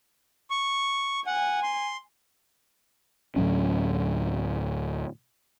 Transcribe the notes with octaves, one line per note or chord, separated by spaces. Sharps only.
C#6
F#5 G#5
C6
D2 A2 F#3 C#4